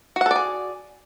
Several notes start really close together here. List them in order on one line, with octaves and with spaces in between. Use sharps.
F#4 F#5 A4 D5 G#4